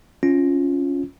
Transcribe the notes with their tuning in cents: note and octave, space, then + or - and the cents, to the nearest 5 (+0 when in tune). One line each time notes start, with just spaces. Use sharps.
C#4 +0 F4 +0